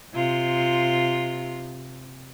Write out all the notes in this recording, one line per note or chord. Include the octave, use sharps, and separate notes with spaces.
C3 F4